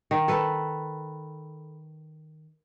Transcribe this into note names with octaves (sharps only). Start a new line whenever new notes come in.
D#3
A4 B4